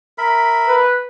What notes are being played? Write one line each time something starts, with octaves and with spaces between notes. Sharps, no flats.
A#4 E5 B5
B4